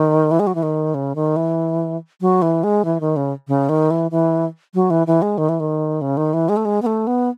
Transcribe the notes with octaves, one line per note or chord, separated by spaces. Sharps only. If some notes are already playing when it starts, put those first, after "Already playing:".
Already playing: D#3
E3
G#3
F#3
E3
D#3
C#3
D#3
E3
F#3
E3
G#3
E3
D#3
C#3
C#3
D#3
E3
E3
F#3
E3
E3
G#3
D#3
E3
D#3
C#3
D#3
E3
G#3
A3
G#3
B3
A3
B3